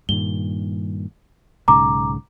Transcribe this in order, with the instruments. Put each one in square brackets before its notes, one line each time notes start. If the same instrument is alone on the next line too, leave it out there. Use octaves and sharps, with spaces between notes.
[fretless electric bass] G2 A#2 D#3 [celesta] G7
[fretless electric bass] B1 G#2 C#3 [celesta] A#5 D6